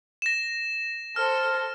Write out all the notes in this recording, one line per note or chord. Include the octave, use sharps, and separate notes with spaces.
A#6 E7
A4 C5 F6